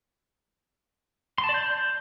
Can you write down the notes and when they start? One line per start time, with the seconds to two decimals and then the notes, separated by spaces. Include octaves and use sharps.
1.38 C6
1.44 A5
1.49 D5
1.54 G6